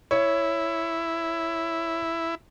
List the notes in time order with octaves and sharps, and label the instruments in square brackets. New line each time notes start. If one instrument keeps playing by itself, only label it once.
[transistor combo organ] E4 [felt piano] C#5